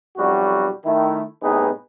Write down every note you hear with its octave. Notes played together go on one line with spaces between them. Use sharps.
B1 F2 G3 F#4
D#3 A3 E4
C2 A2 B3 D#4 G#4 B4